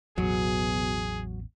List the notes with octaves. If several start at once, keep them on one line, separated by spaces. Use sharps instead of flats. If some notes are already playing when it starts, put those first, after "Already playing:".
A1 E2 B2 F#3 G#4